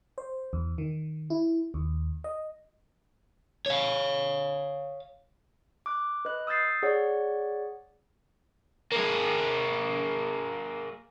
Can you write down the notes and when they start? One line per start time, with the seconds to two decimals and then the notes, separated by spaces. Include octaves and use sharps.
0.18 C5
0.53 E2
0.78 D#3
1.30 E4
1.74 D#2
2.24 D#5
3.66 C#5 F5
5.86 D6 F#6
6.25 B4 D#5 F#6
6.47 D#6 E6 G6 A6 C7
6.83 G#4 C#5 D5 F#5
8.92 A#3 G#4